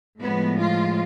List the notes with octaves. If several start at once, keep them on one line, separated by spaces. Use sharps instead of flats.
A2 F3 G#3 B3
F4